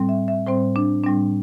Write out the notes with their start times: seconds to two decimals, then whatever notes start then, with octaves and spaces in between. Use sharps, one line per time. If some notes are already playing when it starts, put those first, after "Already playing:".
Already playing: A2 G3 C4
0.09 E5
0.28 E5
0.46 A2 G3 C4 C5
0.76 D4
1.04 A2 G3 C4 D4